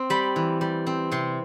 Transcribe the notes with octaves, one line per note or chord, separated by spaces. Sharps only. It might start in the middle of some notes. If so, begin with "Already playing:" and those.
Already playing: C4
G3 B5
E3
G3
C4
C3 C6